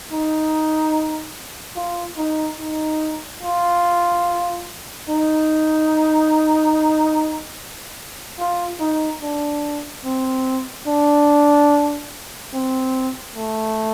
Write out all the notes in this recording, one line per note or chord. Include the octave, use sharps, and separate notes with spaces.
D#4
F4
D#4
D#4
F4
D#4
F4
D#4
D4
C4
D4
C4
A3